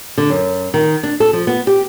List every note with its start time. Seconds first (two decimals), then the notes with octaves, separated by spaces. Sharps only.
0.18 D3
0.30 F#2
0.74 D#3
1.03 D4
1.20 A4
1.33 F3
1.47 B3
1.67 G4